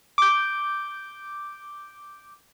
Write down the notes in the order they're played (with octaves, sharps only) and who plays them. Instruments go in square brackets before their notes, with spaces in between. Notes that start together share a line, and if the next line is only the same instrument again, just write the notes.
[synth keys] D6 G6